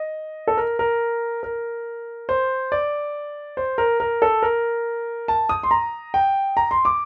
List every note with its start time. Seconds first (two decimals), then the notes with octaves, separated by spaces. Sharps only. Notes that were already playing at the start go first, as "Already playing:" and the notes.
Already playing: D#5
0.48 A4
0.57 A#4
0.79 A#4
1.43 A#4
2.29 C5
2.72 D5
3.57 C5
3.78 A#4
4.00 A#4
4.22 A4
4.43 A#4
5.28 A5
5.49 D#6
5.63 C6
5.71 A#5
6.14 G5
6.57 A#5
6.71 C6
6.85 D6